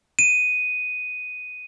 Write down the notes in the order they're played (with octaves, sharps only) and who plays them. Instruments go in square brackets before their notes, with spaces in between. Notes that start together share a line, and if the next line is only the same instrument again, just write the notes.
[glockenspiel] D#7